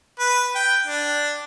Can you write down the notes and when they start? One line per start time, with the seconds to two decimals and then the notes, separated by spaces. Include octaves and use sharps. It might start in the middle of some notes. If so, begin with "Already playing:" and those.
0.19 B4
0.55 G5
0.87 D4